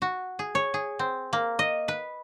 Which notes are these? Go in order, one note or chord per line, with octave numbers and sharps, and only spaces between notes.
F#4
G#4
C#5
G#4
C4
A#3
D#5
B4